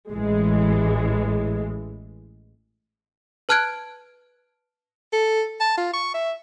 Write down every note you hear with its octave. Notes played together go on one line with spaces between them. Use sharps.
A1 E3 G#3
B4 A5 F6 F#6 G#6 D7
A4
A5
F4
C#6
E5